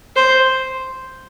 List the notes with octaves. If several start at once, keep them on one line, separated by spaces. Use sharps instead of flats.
C5